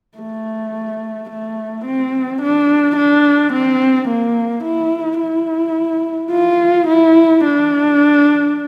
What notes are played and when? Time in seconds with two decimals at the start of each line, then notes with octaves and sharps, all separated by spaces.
0.18 A3
1.29 A3
1.85 C4
2.42 D4
2.96 D4
3.53 C4
4.09 A#3
4.64 E4
5.20 E4
6.31 F4
6.87 E4
7.44 D4